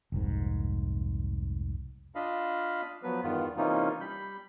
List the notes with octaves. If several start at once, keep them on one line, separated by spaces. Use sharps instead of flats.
F1 C2 G#2
D4 F4 D#5 F5 B5
F3 F#3 B3 B4
E2 G2 D#3 B3 F4
C3 E3 A#3 C#4 D#4 F4
G3 B5 G6